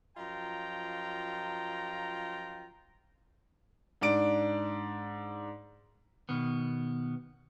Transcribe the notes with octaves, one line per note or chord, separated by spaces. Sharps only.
F#2 F3 F4 D#5 G5 A#5
G#2 D4 D5 D7
B2 D#3 B3